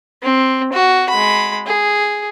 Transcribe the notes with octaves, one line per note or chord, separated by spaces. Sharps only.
C4
F#4
G#3 B5
G#4